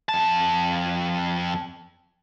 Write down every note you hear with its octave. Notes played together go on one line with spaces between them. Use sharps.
F2 A5